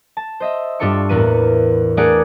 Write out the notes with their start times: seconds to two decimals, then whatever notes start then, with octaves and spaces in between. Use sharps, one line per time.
0.17 A5
0.40 C5 D#5 E5
0.79 G2 D4 F4 A4 C#6 C#7
1.09 E2 A2 E3 A#3 B4 D#7
1.97 A3 D4 G#4 A#4 D5 F#5